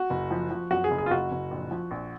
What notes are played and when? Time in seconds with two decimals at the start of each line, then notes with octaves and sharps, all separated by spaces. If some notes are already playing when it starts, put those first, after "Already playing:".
Already playing: F#4
0.10 F#1
0.31 F3
0.50 F3
0.71 F#2 F#4
0.84 G#4
0.91 F#1
0.98 G#4
1.06 F4
1.11 F#1 F#4
1.32 F#1
1.51 A#1
1.71 F3
1.91 A#1